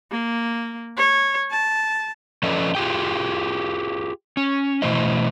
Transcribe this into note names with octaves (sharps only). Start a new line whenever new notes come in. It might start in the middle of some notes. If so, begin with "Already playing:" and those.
A#3
C#5
A5
F3 C#4 A4 B4 D5 D#5
F4 G4 G#4 G5
C#4
B2 E3 A3 E4 C5 D#5